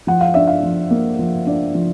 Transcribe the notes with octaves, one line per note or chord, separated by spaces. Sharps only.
F3 F#5
F5
D4 E5
F5
F3
A#3
F3
D4
F3